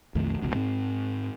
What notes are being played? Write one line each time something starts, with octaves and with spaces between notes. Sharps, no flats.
B1 F2 D#3 A3
E1 C#2 B2
G#2 C4